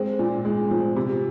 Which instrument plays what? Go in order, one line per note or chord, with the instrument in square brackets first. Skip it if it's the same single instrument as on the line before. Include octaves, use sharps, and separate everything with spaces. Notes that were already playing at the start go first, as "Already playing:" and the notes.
Already playing: [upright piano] G#3 C4
A#2
G#3
F3
C3